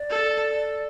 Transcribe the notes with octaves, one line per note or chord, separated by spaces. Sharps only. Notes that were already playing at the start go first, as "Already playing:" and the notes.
Already playing: D5
A4